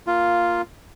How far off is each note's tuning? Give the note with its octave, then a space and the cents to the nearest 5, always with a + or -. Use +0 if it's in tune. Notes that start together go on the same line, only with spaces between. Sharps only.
A#3 +0 F4 +0